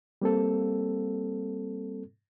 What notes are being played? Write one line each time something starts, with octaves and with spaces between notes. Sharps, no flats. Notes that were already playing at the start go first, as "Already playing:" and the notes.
G3 A#3 C4 A4